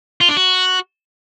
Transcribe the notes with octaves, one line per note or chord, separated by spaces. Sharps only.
F4
D4
F#4